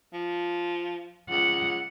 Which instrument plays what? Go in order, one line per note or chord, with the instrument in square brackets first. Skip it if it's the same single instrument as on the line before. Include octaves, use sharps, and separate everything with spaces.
[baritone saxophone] F3
[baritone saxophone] C#2 [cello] F#5